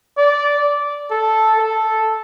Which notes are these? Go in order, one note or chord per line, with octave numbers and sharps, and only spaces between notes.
D5
A4
A4